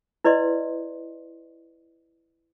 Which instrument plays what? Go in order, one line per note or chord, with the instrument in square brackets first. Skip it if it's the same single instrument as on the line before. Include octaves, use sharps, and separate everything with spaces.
[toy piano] E4 B4 D5 D#5 C6